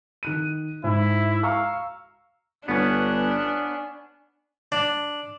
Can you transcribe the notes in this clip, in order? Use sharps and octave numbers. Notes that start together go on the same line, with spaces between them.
D#3 F#6 D#7
G#2 E4
F5 A#5 C#6 E6
G1 B3 C#4 D4
D4